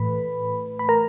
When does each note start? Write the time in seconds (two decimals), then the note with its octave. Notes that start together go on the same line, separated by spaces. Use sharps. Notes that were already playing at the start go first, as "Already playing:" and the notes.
Already playing: A2 E3 A3 B4 B5
0.79 B5
0.89 A#4 A#5